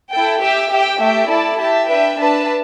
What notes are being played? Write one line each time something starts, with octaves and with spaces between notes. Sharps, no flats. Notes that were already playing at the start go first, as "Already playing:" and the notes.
E4 A4 G5
G4 E5 G5
G4 E5 G5
A3 G4 E5 G5
E4 A4 D5 A5
G4 E5 A5
D4 B4 E5 G5
D4 B4 E5 A5